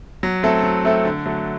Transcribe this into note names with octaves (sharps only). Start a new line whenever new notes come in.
F#3
A3 C4 E4 A4
F#3
A3 C4 E4 A4
D3
F#3 A3